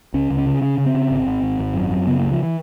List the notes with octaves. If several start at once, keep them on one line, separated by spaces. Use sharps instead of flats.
C#2 C#4
C#2
C#4
C#3
C#3 C#4
C#3
C4
C#3
G#1
G#1
G#1
G#1
F#2
F#2
C#3 B3
C#2 A#3
F3
E3